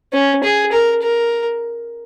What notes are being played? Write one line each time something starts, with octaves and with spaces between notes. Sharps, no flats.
C#4
G#4
A#4
A#4